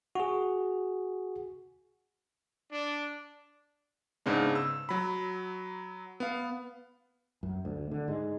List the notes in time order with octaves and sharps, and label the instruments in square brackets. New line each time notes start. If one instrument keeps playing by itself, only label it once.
[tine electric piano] F#4 G#4
[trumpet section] D4
[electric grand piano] G#2 C#3 B3 D4
E6
F#3 B5
B3 F5
[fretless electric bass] F#2
D2
D3
G#2 G#3